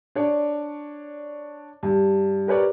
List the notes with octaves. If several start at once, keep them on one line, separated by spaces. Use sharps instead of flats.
D4 C#5 D5
G2
G4 A#4 B4 C#5 D5